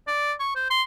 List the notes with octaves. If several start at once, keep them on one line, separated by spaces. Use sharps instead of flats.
D5
C#6
C5
C6